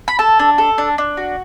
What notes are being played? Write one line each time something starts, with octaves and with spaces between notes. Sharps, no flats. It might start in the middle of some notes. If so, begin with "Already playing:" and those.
B5
A4 A5
D4
A4
D4
D4
F#4